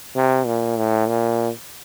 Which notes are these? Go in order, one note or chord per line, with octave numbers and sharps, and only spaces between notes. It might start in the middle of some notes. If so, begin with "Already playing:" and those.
C3
A#2
A2
A#2